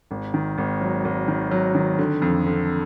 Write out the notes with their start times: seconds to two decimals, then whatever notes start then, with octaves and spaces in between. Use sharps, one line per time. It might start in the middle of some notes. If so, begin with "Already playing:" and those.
0.11 G#1
0.34 D#3
0.58 G#1
0.81 F#3
1.05 G#1
1.28 D#3
1.51 F#3
1.75 D#3
1.99 D3
2.22 F2
2.46 D3